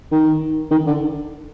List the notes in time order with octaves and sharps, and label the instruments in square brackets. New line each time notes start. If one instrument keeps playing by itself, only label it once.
[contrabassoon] D#3
D#3
D3